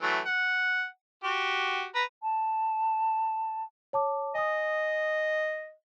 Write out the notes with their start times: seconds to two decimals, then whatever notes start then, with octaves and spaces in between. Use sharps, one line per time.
0.02 E3 F#3 A3
0.25 F#5
1.24 F#4 G4
1.95 B4 A#5
2.23 A5
3.93 C#5 A5 D6
4.35 D#5 G#5 D#6